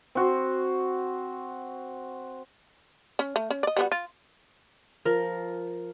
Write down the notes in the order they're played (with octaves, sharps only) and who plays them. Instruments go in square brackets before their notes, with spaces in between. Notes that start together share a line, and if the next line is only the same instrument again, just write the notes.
[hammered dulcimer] C4 F#4
[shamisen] C#4
A3
C#4
D5 D#5
G3 B3 F#4
F4
[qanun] F3 [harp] A#4